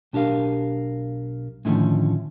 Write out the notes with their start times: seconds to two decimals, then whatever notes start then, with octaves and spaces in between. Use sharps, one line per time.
0.13 B1 D4 G4 A#4 F5
1.65 A2 D3 D#3 F3 A3 C#4